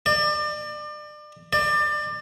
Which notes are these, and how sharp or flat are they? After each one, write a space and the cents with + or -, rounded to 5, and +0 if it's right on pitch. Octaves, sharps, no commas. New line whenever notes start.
D5 +35
D5 +30